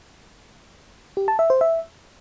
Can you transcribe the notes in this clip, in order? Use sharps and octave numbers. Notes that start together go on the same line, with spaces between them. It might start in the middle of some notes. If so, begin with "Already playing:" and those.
G4
A5
E5
C5
E5